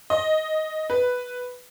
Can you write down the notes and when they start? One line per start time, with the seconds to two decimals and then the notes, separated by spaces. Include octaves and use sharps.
0.10 D#5
0.90 B4